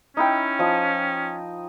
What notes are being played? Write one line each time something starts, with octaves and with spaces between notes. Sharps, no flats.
C#4 D#4 E4 G5
F3 D#5